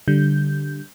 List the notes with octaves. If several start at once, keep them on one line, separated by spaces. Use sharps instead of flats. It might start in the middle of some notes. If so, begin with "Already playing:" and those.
D3 G3 G6